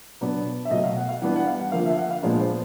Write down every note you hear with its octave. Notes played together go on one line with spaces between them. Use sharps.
B2 F#3 B3 D4
E5
B2 F#3 A3 D#5
F5
F#5
F5
E3 G3 B3 D4 F#5
F#5
F5
F#5
D3 F3 A#3 F5
E5
F5
F#5
F5
A#2 F3 G#3 B3 D4 D5
C5